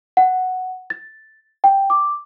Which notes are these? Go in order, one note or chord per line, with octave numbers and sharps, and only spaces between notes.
F#5
A6
G5
D6